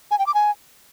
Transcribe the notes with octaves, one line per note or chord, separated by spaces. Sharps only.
G#5
G5
D6
G#5